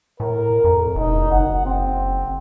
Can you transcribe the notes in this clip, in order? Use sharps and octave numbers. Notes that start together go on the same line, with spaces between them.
A2 A#4
F2
E1 D#4
F#1 F#5
C4